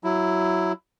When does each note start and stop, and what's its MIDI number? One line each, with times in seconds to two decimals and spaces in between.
0.04 0.72 54
0.04 0.72 64